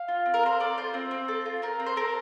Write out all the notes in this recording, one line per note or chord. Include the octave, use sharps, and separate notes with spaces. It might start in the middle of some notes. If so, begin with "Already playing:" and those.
Already playing: F5
F4
C4
A#4
C4 C5
A4 D5
F4 C5
C4
C4
A4
F4
C4 A#4
C4
C5
A4 A#4